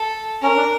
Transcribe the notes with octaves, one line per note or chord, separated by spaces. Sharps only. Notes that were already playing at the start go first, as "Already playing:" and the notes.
Already playing: A4
C#4 A#4
D4